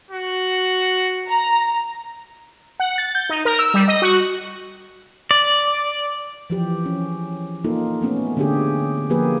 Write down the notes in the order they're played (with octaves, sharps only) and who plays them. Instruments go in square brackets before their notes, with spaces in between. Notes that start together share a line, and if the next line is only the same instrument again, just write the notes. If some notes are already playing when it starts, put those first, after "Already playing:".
[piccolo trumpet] F#4
[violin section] A#5
[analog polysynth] F#5
A6
G6
D#4
A#4
E6
G3
D#5
F#4
[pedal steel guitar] D5
[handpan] E3 F3 G4
C#4
A#3 D#4 F4 A4
A3 B3 C#4
D3 C#4 D4 G4 G#4
F3 A#3 G4 G#4 B4